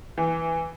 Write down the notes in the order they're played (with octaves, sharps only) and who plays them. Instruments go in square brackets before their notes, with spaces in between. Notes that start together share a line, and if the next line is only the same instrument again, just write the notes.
[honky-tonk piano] E3